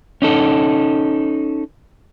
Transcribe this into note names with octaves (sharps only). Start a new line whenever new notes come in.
C#4 D#4 A4